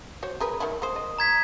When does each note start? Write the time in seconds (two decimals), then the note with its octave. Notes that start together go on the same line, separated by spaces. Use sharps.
0.23 F#4 C5 C#5
0.40 G#4 A#4 B4
0.60 D#3 F#3 E4
0.82 G#3 A#3 C5 D#6
0.96 D#5
1.18 A#5 G#6 B6